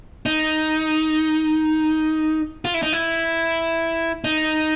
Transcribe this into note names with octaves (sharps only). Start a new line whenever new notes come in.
D#4
F4
E4
D#4
E4
D#4